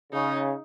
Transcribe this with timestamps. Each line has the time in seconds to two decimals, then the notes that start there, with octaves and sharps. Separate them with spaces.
0.13 C#3 D#4